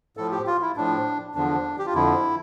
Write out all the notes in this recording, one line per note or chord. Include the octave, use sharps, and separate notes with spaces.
A2 F3 A4
G4
F4
E4
A2 F3 D4
E2 D3 F3 D4
G4
F4
F2 D3 F3 E4